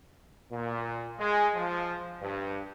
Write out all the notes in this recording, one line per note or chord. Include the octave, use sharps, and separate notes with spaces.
A#2
G#3
F3
G2